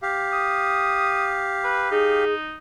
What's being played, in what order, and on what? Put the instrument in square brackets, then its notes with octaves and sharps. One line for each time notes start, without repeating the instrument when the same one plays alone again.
[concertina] G4 F5
[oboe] D#6
B4
[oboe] D#4 [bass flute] G#4